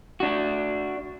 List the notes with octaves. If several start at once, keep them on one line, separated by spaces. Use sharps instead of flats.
D4 F#4